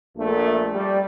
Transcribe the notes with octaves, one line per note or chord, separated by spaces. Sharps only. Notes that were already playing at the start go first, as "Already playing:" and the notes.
A#1 A3
G3